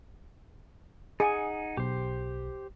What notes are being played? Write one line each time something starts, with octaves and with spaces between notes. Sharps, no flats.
D#4 G#4 F#5 G#5
B1 G4 C5